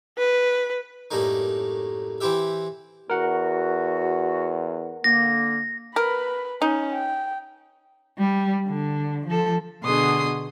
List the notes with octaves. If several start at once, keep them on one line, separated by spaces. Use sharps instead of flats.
B4
F#2 A2 G3 A3 A#3 D#4
E3 C4 E4 G4 E5
E2 F#4 A#4 F#5
D3 A#3 A#6
A#4 B4 B5
C#4 D#4
G5
G3
D3
F3 A4
B2 D3 G#4 C6 D#6